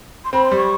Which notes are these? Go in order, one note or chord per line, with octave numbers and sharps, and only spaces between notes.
C6
C4 B5
C6
G3
C#6